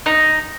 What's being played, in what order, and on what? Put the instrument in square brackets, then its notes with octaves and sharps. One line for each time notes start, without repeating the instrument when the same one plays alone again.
[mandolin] D#4